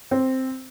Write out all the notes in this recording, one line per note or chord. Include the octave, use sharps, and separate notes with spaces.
C4